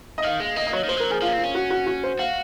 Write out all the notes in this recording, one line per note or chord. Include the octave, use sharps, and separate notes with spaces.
D#5
D#3 F5
G#3 F5
A#3 D#5
D#5
F#3 C#5
D#3
F3 C5
G#3
F#3 A#4
F3 G#4
F3 F4
C#4
C4 F4
C#4
F#4
F#4
F#4
C5
F#4 F5